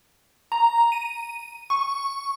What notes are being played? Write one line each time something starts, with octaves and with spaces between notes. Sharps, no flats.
A#5
D#7
C#6